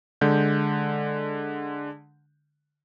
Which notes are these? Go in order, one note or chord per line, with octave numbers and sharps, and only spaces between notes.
D3 G#3 G6